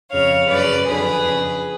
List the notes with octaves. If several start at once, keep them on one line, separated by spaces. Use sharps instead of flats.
F2 C#3 C#5 F5
F#2 C#3 B4 D5
F2 D3 G#4 B4
F2 C#3